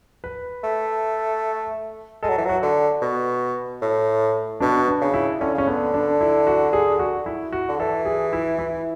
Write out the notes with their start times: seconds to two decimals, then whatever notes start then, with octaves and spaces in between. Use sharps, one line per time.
0.24 B4
0.64 A3
2.23 G#3 A4
2.30 F#3
2.38 E3
2.45 F#3 F#4
2.62 D3
3.02 B2
3.82 A2
4.60 B2 D4
4.88 D4
5.01 C#3
5.14 E4
5.40 D3 C#4
5.54 C#3 C#4
5.67 D3 B3
5.94 D4
6.21 E4
6.47 F#4
6.73 G#4
6.99 F#4
7.26 E4
7.53 F#4
7.69 D3
7.79 E3 A4
8.05 G#4
8.33 E4
8.59 E4